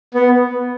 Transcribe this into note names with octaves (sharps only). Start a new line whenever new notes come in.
B3